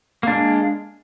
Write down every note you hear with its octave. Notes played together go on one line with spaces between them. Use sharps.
G#3 A#3 D4